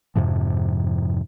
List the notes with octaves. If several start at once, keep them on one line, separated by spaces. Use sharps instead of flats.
F2 G#2 C3 F3